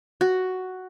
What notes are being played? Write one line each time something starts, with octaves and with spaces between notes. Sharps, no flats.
F#4